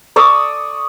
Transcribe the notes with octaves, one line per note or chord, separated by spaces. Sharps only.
D5 C#6 D#6 E6